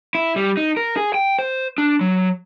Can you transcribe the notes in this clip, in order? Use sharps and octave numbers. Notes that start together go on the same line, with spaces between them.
E4
G3
D#4
A#4
G#4
G5
C5
D4
F#3